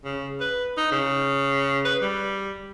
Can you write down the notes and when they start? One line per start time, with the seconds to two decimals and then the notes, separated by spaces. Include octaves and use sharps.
0.04 C#3
0.40 B4
0.77 D#4
0.92 C#3
1.85 B4
2.01 G3